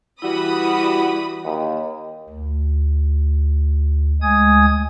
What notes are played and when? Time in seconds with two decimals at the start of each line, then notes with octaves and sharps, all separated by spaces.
0.22 E3 G3 E4 F#4 B5 D#6
1.44 D#2
2.29 D2
4.22 D2 G#3 G#5 D#6 G#6